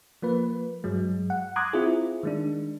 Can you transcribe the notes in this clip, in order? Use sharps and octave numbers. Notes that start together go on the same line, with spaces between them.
F3 A#3 B4
G2 F#3 G#3
F#5
A#5 C6 D6 D#6 F#6 G#6
C4 E4 F4 G#4
D#3 G#3 D4